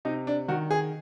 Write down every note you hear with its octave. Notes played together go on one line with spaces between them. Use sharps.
C3 D#4
D4
D#3 F#4
G#4